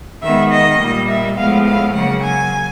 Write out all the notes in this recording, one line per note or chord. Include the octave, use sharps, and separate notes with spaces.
D#3 G#3 B3 E5
D#5
A#2 G3 A#3
E5
A2 F3 G#3 B3 F5
F5
C#3 F#3 A#3 F#5
G#5